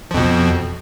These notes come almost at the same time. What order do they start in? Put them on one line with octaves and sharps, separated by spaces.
F3 F2 B2